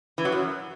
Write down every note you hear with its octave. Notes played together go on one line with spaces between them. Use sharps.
E3
F#3
F#2